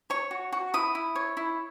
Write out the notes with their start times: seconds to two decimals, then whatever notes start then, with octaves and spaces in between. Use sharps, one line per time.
0.10 C#5 C#6
0.31 F#4
0.52 F#4
0.74 E4 D#6
0.95 E4
1.15 C#5
1.37 E4